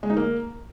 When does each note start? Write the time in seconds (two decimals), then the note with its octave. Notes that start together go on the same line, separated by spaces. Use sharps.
0.03 G#3
0.10 D#4
0.17 A#3